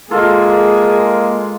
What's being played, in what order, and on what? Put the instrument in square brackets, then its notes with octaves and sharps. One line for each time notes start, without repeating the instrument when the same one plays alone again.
[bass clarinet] G#3 [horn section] A#3 [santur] F4 A4 [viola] G#4